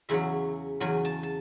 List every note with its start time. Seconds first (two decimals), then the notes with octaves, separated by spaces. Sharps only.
0.09 E2 C#3 F#3 E5
0.80 E2 C#3 F#3 G#5
1.05 A5
1.23 A5